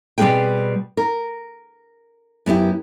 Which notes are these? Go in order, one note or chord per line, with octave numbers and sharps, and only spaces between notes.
B2 G3 C4 G#4 B4 G5
A#4
F#2 B3 E4 G4